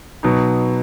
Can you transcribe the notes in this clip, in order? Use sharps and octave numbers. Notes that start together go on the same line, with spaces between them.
B2 F#3 B3 D#4